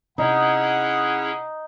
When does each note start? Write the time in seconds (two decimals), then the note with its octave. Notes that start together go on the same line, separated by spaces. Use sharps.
0.18 C3 C#4 D#4 E4 G#4 F#5